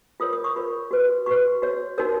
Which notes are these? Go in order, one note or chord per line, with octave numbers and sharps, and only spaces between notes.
F4 A#4 C#5 D#6
D#6
C#6
F4 A#4 C#5 B5
F#4 B4
F#4 B4 C#6
F#4 C#5
D#4 F#4 A#4 C#5